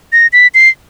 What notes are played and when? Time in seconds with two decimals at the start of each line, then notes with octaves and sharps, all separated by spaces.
0.12 A#6
0.33 B6
0.54 C7